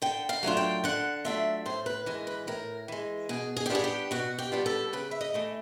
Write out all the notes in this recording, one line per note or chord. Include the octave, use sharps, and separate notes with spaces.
D3 G5
F5
F#3 A3 D4 F4
G5
D3 F#5
F#3 A3 D4 F4 E5
A2 C5
B4
E3 G#3 A#4
B4
A2 A#4
E3 G#3
B2 G#4
G#4
G4
G3 B3 D4 F4 G#4
G4
B2 F#4
G4
G3 B3 D4 F4
A4
C#3 B4
E5
D#5
E3 A3 D4